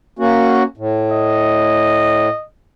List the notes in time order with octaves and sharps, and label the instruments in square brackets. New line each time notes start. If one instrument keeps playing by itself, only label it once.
[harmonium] A#3 C#4 F#4
A2
[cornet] D#5